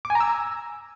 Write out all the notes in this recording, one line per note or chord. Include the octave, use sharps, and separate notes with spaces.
D6
G#5
A#5
E6